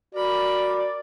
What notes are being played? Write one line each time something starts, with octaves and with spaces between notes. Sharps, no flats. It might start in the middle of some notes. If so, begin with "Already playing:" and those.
F#4 A#4 D5 B5